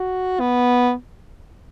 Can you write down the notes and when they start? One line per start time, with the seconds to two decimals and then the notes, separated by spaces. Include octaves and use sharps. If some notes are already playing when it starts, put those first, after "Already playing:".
Already playing: F#4
0.40 B3